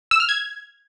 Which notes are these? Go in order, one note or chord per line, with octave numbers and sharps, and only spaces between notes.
E6
F6
G#6